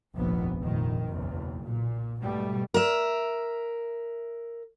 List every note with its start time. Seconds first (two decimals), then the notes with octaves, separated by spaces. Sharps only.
0.15 F1 A#1 D#2 G#2 B3
0.62 F1 A#1 D#3
1.06 F#1 B1 E2
1.62 A#2
2.21 G#2 B2 G3 A3
2.74 A#4 E5